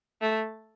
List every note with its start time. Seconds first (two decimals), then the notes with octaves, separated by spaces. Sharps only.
0.22 A3